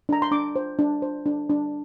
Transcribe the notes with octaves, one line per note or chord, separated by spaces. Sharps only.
D4 A#5
C6
D4 D6
C5
D4
C5
D4
D4